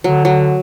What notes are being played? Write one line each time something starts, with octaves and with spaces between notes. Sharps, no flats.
D3 F#3
F#3